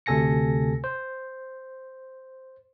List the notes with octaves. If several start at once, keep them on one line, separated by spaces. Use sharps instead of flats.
D2 C3 A4 G#5 A#6 C#7
C5